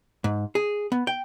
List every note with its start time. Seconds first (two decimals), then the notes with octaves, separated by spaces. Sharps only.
0.24 G#2
0.55 G#4
0.92 B3
1.07 G5